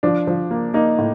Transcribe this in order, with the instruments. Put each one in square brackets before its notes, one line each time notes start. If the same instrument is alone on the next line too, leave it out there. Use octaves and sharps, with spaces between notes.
[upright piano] F3 D4
F3
A#3
A#3 D#4
A2